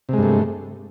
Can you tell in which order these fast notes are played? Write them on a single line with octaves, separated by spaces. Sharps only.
C3 G#3 G2 A3